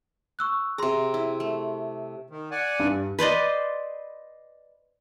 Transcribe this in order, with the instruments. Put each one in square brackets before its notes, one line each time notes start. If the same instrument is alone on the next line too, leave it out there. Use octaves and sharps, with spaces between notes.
[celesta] C#6 E6 F#6
[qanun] C3 A#5 [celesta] G#4 C6
[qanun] E4
A3
[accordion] D#3
D5 F#5 G#5
[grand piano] G2
[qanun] B4 C5 D5 D#5